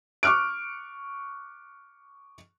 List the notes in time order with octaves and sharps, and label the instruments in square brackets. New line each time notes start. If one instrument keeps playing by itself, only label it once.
[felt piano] C#6 D6 F6 F#6 D7